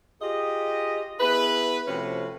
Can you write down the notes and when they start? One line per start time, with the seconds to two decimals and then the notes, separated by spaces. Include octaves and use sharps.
0.22 F4 G4 G#4 D#5
1.20 B3 E4 G#4 B4
1.87 C3 F3 A3 C#4 F#4 B4